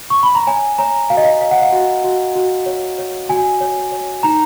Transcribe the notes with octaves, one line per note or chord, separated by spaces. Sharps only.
C#6
B5
A#5
C#5 G#5
C#5 A#5
F#4 F5
D#5
F5
C#5 F5
F#5
F5
F#4
F#4
F#4
C#5
C#5
F#4 G#5
C#5
C#5
D#4 A#5